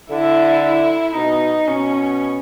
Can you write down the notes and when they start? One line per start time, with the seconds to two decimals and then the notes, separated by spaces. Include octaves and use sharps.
0.10 D3 E4
0.63 E4
1.15 B2 D#4
1.68 B2 C#4